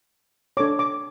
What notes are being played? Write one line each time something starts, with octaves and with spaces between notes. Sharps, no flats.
D4 A4 C#5 D6
D6